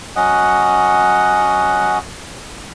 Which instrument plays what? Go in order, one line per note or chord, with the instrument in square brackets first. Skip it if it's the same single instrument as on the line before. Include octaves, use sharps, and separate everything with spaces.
[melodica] F#3 C#4 D#5 F#5